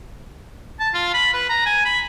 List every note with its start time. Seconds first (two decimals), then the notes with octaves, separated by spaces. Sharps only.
0.80 A5
0.94 F4
1.14 B5
1.34 B4
1.50 A#5
1.66 G#5
1.85 B5